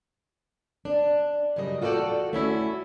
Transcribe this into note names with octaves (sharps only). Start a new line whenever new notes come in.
D4
F#2 C#3 G3 D#5
F4 F#4 A4 B4 D5 G5
A3 C#4 E4 F#4